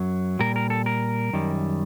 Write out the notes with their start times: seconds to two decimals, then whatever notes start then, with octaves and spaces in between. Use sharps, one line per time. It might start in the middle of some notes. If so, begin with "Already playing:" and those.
Already playing: F#2 F#3
0.39 A#2 G3 A#4
0.56 A#4
0.70 A4
0.86 A#4
1.33 F#2 D#3 G3